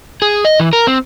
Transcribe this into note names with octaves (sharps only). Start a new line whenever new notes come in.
G#4
D#5
E3
A#4
C4